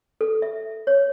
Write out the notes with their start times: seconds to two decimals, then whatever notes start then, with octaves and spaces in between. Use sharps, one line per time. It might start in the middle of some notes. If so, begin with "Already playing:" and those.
0.21 A4
0.42 E5
0.87 C#5